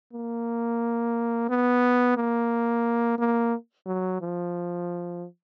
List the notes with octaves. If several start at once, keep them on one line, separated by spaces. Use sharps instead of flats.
A#3
B3
A#3
A#3
F#3
F3